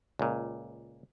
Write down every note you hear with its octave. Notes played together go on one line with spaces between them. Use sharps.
C#2 A#2